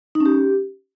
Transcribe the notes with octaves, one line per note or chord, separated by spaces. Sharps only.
D#4
C#4
G4